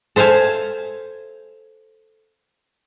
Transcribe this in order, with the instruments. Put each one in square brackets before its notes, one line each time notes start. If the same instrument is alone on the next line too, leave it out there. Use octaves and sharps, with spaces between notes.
[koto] A4 C5 E5 F5 G#5